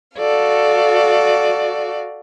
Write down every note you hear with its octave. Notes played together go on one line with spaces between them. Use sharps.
F#4 A4 D5 F5